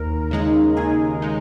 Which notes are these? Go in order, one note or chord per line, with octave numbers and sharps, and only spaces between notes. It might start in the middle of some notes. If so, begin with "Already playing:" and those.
Already playing: D#2 A#4
C#3 G#3 D#4
D#2 G#4
G#3 D#4